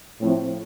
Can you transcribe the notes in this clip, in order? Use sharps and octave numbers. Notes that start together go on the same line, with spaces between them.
A2 F3 A3 C4